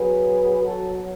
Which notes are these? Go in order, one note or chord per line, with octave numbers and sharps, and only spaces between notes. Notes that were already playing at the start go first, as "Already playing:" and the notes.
Already playing: B2 F#3 G#4 B4
F#4 A4